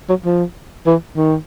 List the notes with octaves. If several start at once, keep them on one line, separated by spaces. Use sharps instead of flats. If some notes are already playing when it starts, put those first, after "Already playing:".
F#3
F3
E3
D#3